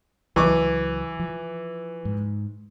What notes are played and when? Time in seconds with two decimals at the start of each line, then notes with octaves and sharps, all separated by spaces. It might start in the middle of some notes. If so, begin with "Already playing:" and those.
0.36 C#2 E3 F#3 C#6 D6
1.19 F3
2.05 G#2